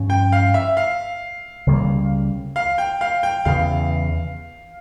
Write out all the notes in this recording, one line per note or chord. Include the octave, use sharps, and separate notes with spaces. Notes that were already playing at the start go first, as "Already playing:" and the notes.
Already playing: G2 F3 C#4
G5
F5
E5
F5
C#2 C#3 G3 A#3
F5
G5
F5
G5
E2 C#3 E3 F5